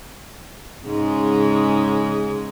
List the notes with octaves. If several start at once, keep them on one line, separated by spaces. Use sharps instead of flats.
G#2 C#3 G#3